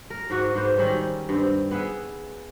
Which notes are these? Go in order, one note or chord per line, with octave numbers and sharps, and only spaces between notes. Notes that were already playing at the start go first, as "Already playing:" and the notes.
A#4
G#2 F#4 D#5
G#2 B3 C5
D#3 G3 C4 C#4
G2 C4
B3 G#4 E5